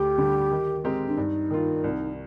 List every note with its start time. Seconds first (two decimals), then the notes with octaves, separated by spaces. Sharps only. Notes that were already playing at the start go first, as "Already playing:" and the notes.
Already playing: D2 G4
0.18 D3 G3 D4
0.51 D#3
0.84 G#3 C4 G4 A#4
1.08 D4
1.17 G2 D#4
1.50 D#3 A#3 F4
1.84 C2